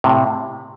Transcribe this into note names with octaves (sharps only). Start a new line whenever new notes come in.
A2 C3